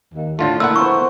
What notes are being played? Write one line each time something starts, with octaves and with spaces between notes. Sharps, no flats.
D#2
A2 D3 A3 F4
A#2 A3 E4 F#5 E6
B3 A#4 C5 C#6